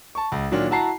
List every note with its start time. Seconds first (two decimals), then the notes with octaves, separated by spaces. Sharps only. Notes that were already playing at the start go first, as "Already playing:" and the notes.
0.15 A5 C#6
0.32 C#2
0.52 A#2 D#3 F#3 D4 F4
0.71 E4 F#4 A5 A#5 C7